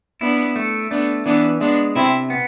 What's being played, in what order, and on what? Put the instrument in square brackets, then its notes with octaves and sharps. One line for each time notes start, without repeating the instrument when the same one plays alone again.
[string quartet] B3 D4 [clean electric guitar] E4
[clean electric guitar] A3
[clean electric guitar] A3 [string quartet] B3 D4
[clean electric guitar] E3 [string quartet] B3 D4
[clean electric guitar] G#3 [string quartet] B3 D4
[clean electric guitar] C3 [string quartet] C4 E4
[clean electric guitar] B3